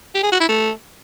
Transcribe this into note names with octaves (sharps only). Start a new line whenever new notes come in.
G4
G#4
F#4
E4
A3